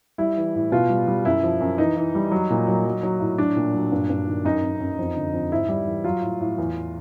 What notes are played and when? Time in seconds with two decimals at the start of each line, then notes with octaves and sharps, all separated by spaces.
0.18 G3 E4
0.37 E3
0.55 A2
0.72 B2 F4
0.89 G3
1.08 G3
1.25 F#2 E4
1.44 F3
1.60 F#2
1.78 E3 D#4
1.97 E3
2.15 G3
2.32 F#3
2.50 A#2
2.67 F#3
2.85 F#3
3.03 F#3
3.20 A2
3.38 F#3 D4
3.56 A#2
3.74 F#3
3.92 G2
4.10 G2
4.27 D#3
4.44 F#2 D#4
4.63 F#2
4.80 F#2
4.99 F2
5.16 D3
5.33 F2
5.51 G#2 E4
5.69 G3
5.87 E3
6.04 F#3 F4
6.22 A2
6.40 A2
6.58 E2